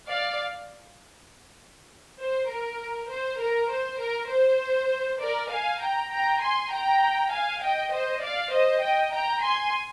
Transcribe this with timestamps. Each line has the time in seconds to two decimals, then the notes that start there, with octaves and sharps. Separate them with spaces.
0.09 D5 F5
2.20 C5
2.50 A#4
3.10 C5
3.41 A#4
3.71 C5
4.01 A#4
4.30 C5
5.21 A#4 D5
5.51 F5 G#5
5.81 G5 A#5
6.11 G5 A#5
6.41 G#5 C6
6.72 G5 A#5
7.31 F5 G#5
7.62 D#5 G5
7.92 C5 D#5
8.22 D5 F5
8.52 C5 D#5
8.82 D#5 G5
9.12 G5 A#5
9.43 G#5 C6